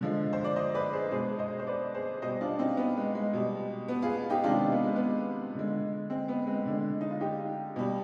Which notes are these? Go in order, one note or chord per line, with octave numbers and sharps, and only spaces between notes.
D3 F3 G#3
C5
D5
C5 D#5
B4 D5
G#4 C5
B2 G#3 G#4 C5
C5 D#5
C5
B4 D5
G#4 C5
B2 G3 C5 D#5
D4 F4
C4 D#4
B3
G#3
G#3
B2 G3
B3
F4 G#4
D#4 G4
C3 D#3 G#3 D4 F4
B3
G#3
B3
D3 G#3
G#3 C4
B3
G#3 C4
D3 G#3
D#4
F4
D#4 G4
B2 G3